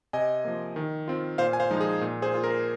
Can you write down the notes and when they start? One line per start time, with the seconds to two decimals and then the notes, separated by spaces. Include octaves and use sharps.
0.13 C3 D#5 G#5
0.44 F3 A#3
0.76 D#3
1.08 C4 F4
1.38 A#2 C5 F5
1.53 G#5
1.60 C5 F5
1.71 F3 G#3 D#4
1.81 G#4
2.01 A#2
2.22 G#4 C5
2.33 A#3 F4
2.44 A#4